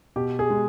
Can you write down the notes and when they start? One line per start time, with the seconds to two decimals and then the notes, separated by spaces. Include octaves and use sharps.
0.16 B2 G4
0.39 G#4
0.50 G#3